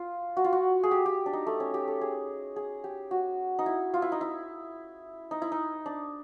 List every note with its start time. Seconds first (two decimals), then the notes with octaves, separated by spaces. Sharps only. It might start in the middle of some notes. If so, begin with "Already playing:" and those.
Already playing: F4
0.37 F#4
0.44 F4
0.53 F#4
0.83 G#4
0.91 G4
1.06 G4
1.26 D4
1.33 D#4
1.46 A3
1.60 C#4
1.74 G4
1.88 A4
2.01 G#4
2.56 G#4
2.84 G4
3.11 F#4
3.59 D#4
3.66 E4
3.94 F4
4.02 E4
4.12 D#4
4.21 E4
5.31 D#4
5.42 E4
5.52 D#4
5.86 D4